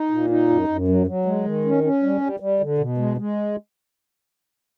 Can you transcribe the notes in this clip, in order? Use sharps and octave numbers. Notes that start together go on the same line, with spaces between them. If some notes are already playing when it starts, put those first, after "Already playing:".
Already playing: D#4
A#2
D#4
F#2
F#2
F#3
F#3
G#3
D#3
C#4
C#4
G3
G3
G3
D3
B2
G#3
G#3